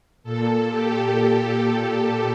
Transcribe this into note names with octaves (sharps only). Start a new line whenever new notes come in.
A#2 A4
G4
A4
G4